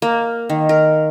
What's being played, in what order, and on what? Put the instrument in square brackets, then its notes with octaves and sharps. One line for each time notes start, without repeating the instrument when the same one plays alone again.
[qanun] A#3
D#3
A#4